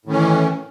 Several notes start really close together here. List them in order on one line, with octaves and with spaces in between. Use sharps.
A2 D#3 C#4 E3